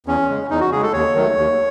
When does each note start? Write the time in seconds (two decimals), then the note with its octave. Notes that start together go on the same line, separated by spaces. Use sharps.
0.07 E2 C#4
0.29 C#3 G#3
0.50 E2 D#4
0.61 F#4
0.72 C#3 G#3 G#4
0.83 A4
0.93 D#2 C#5
1.15 D#3 F#3 A3
1.37 D#2